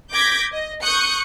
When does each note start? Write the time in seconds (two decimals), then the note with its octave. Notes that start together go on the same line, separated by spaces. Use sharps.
0.12 D6 G6 G#6 A#6 B6
0.52 D#5
0.83 C#6 D#6 F#6 G6 C#7